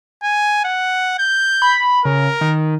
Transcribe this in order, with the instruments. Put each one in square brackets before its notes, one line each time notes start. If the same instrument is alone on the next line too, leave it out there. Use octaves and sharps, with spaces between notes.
[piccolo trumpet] G#5
F#5
G6
[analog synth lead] B5
[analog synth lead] C#3 [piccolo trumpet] A#4
[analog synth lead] D#3